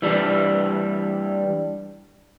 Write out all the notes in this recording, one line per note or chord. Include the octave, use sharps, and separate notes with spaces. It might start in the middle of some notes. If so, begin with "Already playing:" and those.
E3 G3 D4